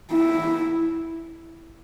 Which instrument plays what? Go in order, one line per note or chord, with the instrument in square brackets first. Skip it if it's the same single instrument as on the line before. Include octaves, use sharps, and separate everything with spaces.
[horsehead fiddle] E4